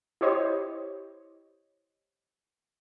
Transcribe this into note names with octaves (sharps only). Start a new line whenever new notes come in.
E4 G4 C5 C#5 D#5